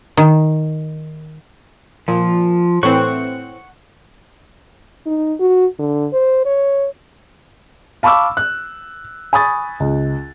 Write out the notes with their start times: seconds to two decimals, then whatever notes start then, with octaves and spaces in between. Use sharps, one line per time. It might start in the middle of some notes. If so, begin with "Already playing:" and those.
0.17 D#3
2.08 A#2 F3
2.83 A2 E3 C4 F#5 C#6
5.06 D#4
5.40 F#4
5.79 D3
6.13 C5
6.45 C#5
8.03 F5 A5 B5 C#6 D6 E6
8.37 F#6
9.33 G#5 B5 C#6 D#6 A6
9.80 C#2